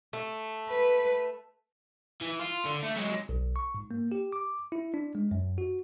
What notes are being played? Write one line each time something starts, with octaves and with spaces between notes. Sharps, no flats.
A3
B4
E3
F4
D3
A3
F#3 G#3
B1
C#6
G#2
A#3
G4
D6
E4
D4
G#3
F#2
F#4